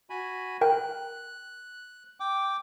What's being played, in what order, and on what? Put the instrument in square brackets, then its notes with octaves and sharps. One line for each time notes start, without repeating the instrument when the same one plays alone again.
[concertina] F#4 G#5 B5
[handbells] A#4 G5 [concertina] F#6
[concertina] G5 D6